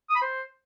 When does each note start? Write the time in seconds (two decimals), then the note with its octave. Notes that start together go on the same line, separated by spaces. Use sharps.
0.10 D#6
0.16 B5
0.22 C5